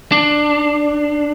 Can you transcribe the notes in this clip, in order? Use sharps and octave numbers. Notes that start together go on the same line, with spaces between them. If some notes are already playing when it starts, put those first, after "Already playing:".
D4